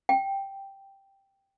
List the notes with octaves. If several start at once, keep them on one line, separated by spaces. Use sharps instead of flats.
G5